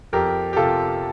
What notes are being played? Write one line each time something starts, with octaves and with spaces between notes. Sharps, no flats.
F2 G4 A#4
G4
C3 F4 A4